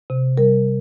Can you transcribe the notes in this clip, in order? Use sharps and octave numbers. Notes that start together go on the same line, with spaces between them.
C3
G3 A#4